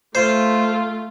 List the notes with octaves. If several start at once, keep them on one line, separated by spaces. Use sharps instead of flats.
A3 F4 C5